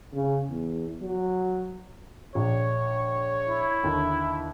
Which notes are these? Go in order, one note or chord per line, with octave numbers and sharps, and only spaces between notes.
C#3
E2
F#3
A#1 C#5
E4
D#2 D3